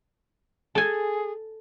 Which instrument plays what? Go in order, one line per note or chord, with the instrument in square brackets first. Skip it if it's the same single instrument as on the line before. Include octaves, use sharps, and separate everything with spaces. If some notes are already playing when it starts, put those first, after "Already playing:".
[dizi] G#4 [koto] A4 G#5